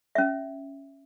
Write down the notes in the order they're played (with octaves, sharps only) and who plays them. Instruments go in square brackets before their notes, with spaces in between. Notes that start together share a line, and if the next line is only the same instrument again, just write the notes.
[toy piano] C#4 E5